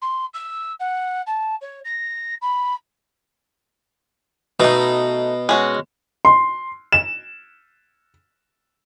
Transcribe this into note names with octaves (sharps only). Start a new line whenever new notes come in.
C6
E6
F#5
A5
C#5
A#6
B5
B2 A3 D#4
G#3 C#4 F#4
C6
E7